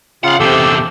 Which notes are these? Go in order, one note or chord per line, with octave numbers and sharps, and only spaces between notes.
C#3 F4 F5 F#5
E2 C3 G4 A4 E6